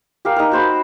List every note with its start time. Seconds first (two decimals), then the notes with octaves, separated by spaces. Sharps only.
0.25 G4 A#4 F5
0.36 D#4 A#4
0.52 F#4 C5 B5